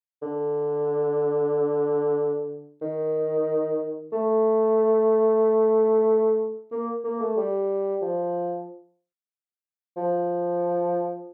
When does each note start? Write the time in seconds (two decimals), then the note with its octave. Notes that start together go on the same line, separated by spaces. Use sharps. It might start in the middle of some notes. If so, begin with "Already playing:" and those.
0.22 D3
2.82 D#3
4.12 A3
6.72 A#3
7.04 A#3
7.21 A3
7.37 G3
8.01 F3
9.97 F3